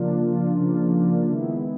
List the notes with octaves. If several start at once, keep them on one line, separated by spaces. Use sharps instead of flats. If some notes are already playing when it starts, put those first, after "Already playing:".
Already playing: C#3 F3 A#3 D4 F4
C#3 F3 A#3 D4 F4
C#3 F3 A#3 D4 F4
C#3 F3 A#3 D4 F4
D#3 G#3 B3 E4